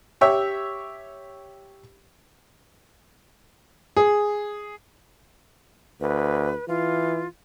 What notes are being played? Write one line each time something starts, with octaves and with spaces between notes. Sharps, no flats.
G4 C#5 E5 G5
G#4
D2 B4
E3 F4